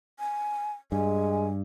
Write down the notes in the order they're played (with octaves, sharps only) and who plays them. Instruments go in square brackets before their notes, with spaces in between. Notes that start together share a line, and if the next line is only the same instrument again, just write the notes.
[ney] G#5
[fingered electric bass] G2 [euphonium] G#3 [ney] G#5